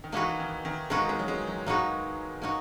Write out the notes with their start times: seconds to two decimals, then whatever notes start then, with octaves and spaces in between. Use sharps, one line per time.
0.04 D#3
0.12 E3 A#3 D#4 F#4 B4
0.39 D#3
0.65 D#3
0.90 G#3 A#3 D#4 F#4 B4
1.09 G#3
1.19 F#3
1.28 G#3
1.47 F#3
1.66 A#3 D#4 F#4 B4
2.42 A#3 D#4 F#4